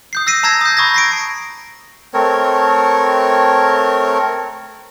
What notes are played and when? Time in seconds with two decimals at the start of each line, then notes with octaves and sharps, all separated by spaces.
0.13 D#6 G6 C7
0.27 E6 A#6 C7 D#7
0.43 A5 A#5 E6 G#6 A#6
0.61 D#6 G6
0.77 B5 C#6 D#6 G#6 A#6
0.94 A#6 C7 D7
2.14 A3 C4 A#4 C#5